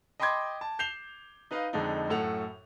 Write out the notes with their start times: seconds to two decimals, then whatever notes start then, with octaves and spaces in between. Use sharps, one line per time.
0.20 D#5 G5 B5 C6 D6 G#6
0.61 A5
0.79 G6 C7 E7 F7 G7
1.51 D#4 B4 D#5 F5
1.73 F2 D3 G#3 D4 D#4
2.09 F#2 A2 A4 F#5 F7